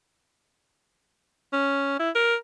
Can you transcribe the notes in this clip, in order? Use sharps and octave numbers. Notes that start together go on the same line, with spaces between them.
C#4
E4
A#4